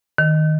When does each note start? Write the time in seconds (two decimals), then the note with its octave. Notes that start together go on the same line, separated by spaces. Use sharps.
0.18 D#3